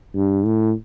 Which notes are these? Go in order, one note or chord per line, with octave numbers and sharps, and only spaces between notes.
G2
A2